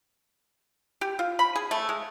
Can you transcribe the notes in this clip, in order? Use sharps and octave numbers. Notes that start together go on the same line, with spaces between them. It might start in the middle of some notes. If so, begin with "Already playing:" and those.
G4
F4
B5
G#4
A3
G#3